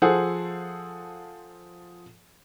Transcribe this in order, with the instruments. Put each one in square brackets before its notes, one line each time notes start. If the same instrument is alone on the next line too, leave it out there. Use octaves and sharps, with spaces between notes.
[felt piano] F3 G#4 A4 C5 F#5